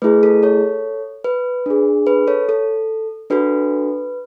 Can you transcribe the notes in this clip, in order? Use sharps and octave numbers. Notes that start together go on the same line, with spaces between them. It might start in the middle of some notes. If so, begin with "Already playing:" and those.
A3 E4 G#4 B4
A4
A4 C#5
B4
D4 G#4
B4
A4 C#5
A4
D4 F#4 A4 B4